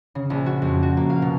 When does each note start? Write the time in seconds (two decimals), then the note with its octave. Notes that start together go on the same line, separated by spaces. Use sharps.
0.15 C#3
0.30 A#1
0.46 F#4
0.62 F2
0.83 F#4
0.97 A#3
1.10 F5
1.22 B2